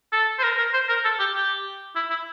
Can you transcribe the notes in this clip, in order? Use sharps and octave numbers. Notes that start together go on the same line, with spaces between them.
A4
C5
A#4
A#4
C5
A#4
A4
G4
G4
E4
E4